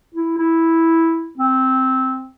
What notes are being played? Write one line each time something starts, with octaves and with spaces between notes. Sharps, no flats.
E4
E4
C4